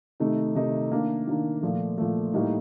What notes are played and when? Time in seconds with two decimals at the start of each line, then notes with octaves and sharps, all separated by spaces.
0.20 C3 D#3 A3 D#4
0.55 C3 D#3 A3 D#4
0.91 D#3 A#3 D4
1.27 D#3 A#3 D4
1.63 A#2 F3 A3
1.98 A#2 F3 A3
2.33 A2 G3 A#3 D#4